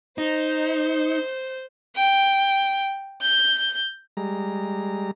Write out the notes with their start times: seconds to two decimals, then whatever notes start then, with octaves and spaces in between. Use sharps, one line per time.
0.18 D#4 C5 G6
1.96 G5
3.22 G6
4.17 G3 G#3 A#5